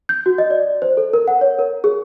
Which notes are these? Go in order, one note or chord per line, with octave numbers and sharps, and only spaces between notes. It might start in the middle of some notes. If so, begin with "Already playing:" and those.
G6
F#4
D#5
D5
C5
A4
A#4
F#5
C#5
A#4
G#4